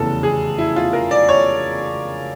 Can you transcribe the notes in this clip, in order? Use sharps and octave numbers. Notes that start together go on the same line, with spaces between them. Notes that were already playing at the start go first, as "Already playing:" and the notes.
Already playing: F1 E2 C#3 E3 A4
G#4
E4
F4
A#4
D5
C#5